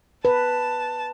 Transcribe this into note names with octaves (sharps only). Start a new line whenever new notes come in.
B4 A5